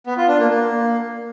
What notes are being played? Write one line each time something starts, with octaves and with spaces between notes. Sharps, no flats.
B3
F4
D4
A#3
A#3